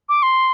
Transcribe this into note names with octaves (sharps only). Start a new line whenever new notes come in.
D6
C6